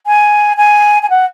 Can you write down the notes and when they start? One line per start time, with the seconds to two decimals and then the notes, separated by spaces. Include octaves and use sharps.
0.06 G#5
0.57 G#5
1.02 G#5
1.09 F#5